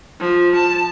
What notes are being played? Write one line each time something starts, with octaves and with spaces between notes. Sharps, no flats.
F3
A5